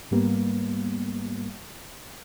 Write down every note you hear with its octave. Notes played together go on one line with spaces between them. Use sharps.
G#2 G3 A#3 B3